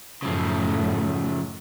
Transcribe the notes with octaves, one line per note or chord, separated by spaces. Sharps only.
F#2 A2 C#3 F3 A3